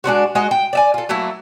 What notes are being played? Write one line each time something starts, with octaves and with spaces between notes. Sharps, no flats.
G#3 D4 F4 F#4
G#3 F#4 A#4 D#5
G5
D5 E5 G#5
F4 A4
F#3 A3 A#3 E4